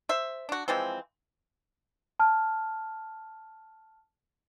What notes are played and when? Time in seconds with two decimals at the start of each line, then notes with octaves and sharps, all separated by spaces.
0.09 C5 E5
0.49 D4 F#4
0.68 E3 F3 G#3 C4
2.20 A5 F6